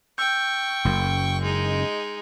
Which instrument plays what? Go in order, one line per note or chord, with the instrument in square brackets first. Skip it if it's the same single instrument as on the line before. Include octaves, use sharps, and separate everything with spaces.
[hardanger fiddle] G5 C#6 [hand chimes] E6 G6
[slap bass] F#1 F#2
[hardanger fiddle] G#3 D#4